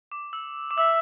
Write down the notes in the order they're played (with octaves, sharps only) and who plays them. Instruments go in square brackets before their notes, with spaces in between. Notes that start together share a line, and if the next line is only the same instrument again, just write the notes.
[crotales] D6
E6
D6
[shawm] E5 [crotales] E6